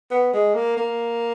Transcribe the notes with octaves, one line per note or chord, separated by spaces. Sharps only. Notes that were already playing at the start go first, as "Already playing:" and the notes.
B3
G#3
A#3
A#3